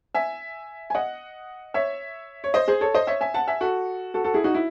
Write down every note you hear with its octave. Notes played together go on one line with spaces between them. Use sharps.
E5 G#5
G#5
D#5 F#5
C#5 E5
C#5
C5 D#5
G#4 C5
A4 C#5
C5 D#5
C#5 E5
E5 G#5
F#5 A5
E5 G#5
F#4 A4
F#4 A4
F#4 A4
E4 G#4
D#4 F#4
E4